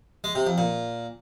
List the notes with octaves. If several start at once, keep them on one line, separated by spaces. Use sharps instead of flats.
G#3
C3
F2
A#2